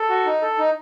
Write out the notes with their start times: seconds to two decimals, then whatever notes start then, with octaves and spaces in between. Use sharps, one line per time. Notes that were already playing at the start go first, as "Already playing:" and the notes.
Already playing: A4
0.09 F#4
0.26 D#4
0.42 A4
0.58 D#4